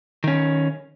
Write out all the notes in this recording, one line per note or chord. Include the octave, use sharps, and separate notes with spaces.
D#3 C#4